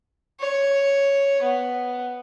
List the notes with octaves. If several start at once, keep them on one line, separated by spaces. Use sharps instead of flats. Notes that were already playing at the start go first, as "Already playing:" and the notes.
C#5
B3